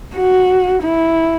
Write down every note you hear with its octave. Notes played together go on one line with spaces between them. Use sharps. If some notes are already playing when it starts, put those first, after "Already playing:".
F#4
E4